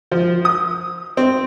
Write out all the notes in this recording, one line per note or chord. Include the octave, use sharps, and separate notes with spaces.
F3
D#6
C4